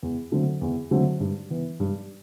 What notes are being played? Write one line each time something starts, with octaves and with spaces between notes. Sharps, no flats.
E2
D3 F#3 A3 C4
E2
D3 F#3 A3 C4
G2
E3 B3
G2